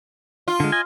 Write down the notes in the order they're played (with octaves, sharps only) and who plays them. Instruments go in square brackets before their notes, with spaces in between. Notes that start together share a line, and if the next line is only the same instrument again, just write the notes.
[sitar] F4
[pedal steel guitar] D3 G#3
D#5 G#5